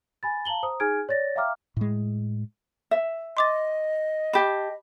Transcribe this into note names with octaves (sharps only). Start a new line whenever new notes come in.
G#5 B5 A6
F5 A5 A#5 F#7 G7
C5 A#5 D#6
D#4 G#4 G#5 F6 G#6 D7
C#5 D5 A6 A#6
E5 F5 G5 A#5 D6 F6
A2 G#3
E5
D#5 C6 D6 A6
G4 A5 B5